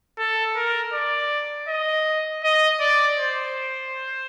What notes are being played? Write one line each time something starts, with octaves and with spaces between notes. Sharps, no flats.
A4
A#4
D5
D#5
D#5
D5
C5